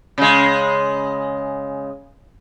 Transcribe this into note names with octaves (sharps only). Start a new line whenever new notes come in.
C#3 G#3